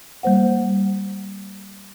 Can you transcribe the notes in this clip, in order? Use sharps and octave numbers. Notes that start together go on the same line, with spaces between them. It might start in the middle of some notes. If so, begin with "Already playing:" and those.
G3 A#3 C5 F#5